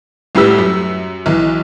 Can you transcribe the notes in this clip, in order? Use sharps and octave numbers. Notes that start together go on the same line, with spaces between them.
C2 A2 G3 B4 E6 B6
F#2
B1 E3